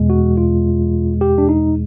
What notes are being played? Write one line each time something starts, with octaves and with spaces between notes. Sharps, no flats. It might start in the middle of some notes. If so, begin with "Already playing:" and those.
Already playing: E2 B2 G#3
F#4
F4
G4
D4
D#4